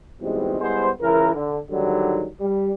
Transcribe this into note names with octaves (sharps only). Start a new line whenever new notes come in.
G#2 B2 E3 G3 G#3 C4
G3 G#3 B3 E4 C5
C#2 C#3 E3 A#4
D3
G#2 D3 D#3 F#3 G3
G3